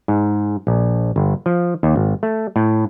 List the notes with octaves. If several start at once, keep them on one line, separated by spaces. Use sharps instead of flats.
G#2
A#1
G1
F3
D#2
G#1
A3
A2